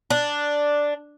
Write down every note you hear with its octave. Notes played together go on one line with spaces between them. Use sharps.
D4